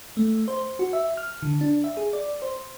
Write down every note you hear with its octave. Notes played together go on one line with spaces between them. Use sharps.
A3
C5
F#4
E5
F6
D3
D4
E5
G#4
D5
C5